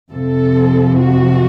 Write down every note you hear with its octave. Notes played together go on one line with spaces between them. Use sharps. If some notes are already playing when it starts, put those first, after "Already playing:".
F2 C3 F3 A4
F#4